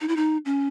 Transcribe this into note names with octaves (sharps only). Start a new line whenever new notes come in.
D#4
E4
D#4
C#4